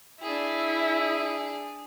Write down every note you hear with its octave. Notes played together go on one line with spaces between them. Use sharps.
D4 E4 G#4